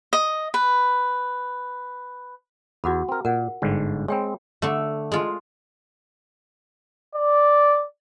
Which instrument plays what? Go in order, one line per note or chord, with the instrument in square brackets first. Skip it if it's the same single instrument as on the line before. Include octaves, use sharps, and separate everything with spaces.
[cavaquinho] D#5
B4
[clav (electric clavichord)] E2 [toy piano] F#4 F#5 B5
[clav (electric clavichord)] C4 A#4
[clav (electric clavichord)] A#2 [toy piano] A#4 F#5
[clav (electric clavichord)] G1 G#2 D3
[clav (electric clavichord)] G#3 C4 [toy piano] C#5 G5 B5
[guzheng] D3 A3
G#3 F4
[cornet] D5